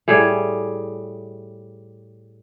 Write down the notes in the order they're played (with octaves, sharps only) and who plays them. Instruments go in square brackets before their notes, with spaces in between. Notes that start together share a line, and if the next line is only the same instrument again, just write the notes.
[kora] A2 G3 G#4